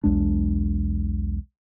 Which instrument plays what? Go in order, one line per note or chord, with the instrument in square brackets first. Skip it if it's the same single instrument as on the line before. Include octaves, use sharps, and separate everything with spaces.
[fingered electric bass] B1 E2 G#3 D4